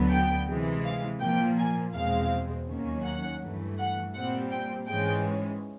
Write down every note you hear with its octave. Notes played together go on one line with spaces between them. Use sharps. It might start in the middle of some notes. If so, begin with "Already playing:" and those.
Already playing: D2 D3 F#3 B3
G5
C3 E3 G#3
F5
A#2 F3 A#3 G5
G#5
E2 B2 G#3 C4 F5
D#2 D#3 F#3 A#3 C#4
F#5
G2 E3 A3
F#5
A#2 G3 C4 F#5
G5
G#2 E3 G#3 C#4 G5